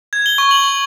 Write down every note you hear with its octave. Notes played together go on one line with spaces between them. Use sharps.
G#6
G7
C#6
F#7
F#7